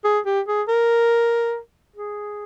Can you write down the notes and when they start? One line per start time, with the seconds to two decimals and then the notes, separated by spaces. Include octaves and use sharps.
0.04 G#4
0.26 G4
0.48 G#4
0.68 A#4
1.96 G#4